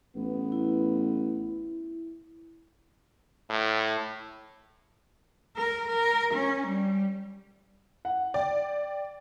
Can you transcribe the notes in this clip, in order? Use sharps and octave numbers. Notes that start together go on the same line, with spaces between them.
A1 B3
E4
A2
A#4
A#4
C#4
G3
F#5
D5 G5